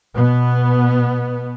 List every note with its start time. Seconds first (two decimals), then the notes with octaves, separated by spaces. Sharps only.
0.14 B2 B3